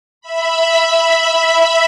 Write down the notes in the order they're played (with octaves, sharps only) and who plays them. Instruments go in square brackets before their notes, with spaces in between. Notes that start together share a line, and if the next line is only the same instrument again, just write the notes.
[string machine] E5 B5